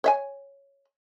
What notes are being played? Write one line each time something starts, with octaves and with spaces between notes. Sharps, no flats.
C#5 E5 G#5